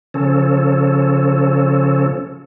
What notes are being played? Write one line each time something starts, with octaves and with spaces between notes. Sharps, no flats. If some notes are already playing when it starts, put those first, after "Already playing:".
C#3 F3 C#4 A4